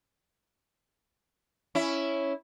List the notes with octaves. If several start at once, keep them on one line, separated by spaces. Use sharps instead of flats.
C#4 E4